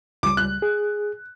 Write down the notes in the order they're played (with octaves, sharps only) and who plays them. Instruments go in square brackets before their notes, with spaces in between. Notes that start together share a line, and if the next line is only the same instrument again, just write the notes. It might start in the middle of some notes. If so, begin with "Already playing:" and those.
[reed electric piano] C#2 G3 [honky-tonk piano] D6
[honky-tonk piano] F#6
[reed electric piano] G#4